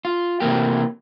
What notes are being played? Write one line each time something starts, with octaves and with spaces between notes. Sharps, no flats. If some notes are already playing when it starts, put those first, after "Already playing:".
F4
C3 E3 A3 A#3 G4